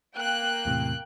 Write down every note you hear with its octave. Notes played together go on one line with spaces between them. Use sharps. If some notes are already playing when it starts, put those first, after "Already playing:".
A#3 G5 F#6
E2 A2 C3